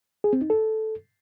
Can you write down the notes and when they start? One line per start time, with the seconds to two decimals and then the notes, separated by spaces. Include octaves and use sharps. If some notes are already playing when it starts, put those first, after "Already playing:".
0.24 G#4
0.33 C4
0.41 D#4
0.50 A4